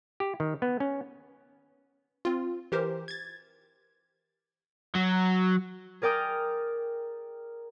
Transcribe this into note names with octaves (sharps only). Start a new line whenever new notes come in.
G4
D#3
B3
C#4
C4 F4
E3 G4 A#4 C5
G#6 A6
F#3
G#4 A#4 D5 G5 D#6 F6